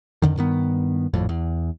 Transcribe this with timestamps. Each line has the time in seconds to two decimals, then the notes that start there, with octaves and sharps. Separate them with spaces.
0.22 F2 D3 D#3
0.37 G2 D#3 B3
1.14 G#1 F2 A2
1.29 E2